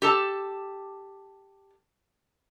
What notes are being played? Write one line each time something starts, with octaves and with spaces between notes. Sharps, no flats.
G4 A4 A5